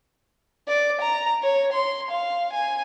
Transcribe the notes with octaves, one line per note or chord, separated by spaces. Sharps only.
D5
A#5
C#5
C6
F5
G#5